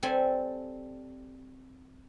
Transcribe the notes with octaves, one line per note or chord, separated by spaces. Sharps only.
G3 C4 A4 G#5 C6